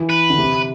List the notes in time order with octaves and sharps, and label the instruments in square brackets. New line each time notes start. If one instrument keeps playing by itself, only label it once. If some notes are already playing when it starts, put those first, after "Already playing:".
Already playing: [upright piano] E3
[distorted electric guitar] B4
[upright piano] D3
C3